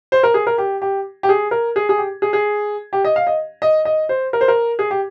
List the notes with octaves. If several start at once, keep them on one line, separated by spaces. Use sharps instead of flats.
C5
A#4
G#4
A#4
G4
G4
G4
G#4
A#4
G#4
G#4
G4
G#4
G#4
G4
D#5
F5
D#5
D#5
D#5
C5
A#4
C5
A#4
G#4
G4